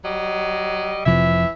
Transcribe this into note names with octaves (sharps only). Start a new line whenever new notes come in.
F#3 G3 D#5
F1 C3 E3 F3 E5